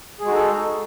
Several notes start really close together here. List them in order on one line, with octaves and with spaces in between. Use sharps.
G#4 G#3 F#4 D#4 A4